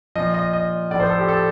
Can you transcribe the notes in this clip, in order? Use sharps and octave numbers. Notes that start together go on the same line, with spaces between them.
A#2 F3 D#5
D#5
D#5
A2 F3 C5 D5
A4
G4
A4